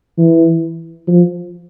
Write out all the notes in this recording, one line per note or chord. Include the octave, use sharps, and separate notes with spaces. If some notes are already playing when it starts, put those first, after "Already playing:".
E3
F3